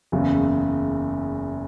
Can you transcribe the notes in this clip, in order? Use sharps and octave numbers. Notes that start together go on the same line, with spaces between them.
F#1 E2 C#3